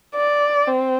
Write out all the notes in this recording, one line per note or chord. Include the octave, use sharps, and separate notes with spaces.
D5
C4